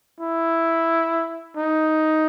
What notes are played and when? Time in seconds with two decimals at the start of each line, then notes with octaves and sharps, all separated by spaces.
0.21 E4
1.57 D#4